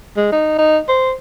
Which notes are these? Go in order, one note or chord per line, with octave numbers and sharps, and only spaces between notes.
G#3
D#4
D#4
C5